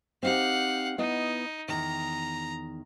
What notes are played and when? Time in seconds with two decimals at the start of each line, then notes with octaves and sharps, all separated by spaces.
0.23 C4 D#4 G4 F5 F#5
0.98 B3 D#4 E4 D#5
1.68 E2 D#3 A#5